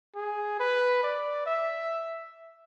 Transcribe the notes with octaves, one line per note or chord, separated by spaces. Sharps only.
G#4
B4
D5
E5